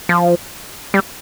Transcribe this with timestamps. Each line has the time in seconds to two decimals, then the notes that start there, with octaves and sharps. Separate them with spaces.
0.09 F3
0.94 G3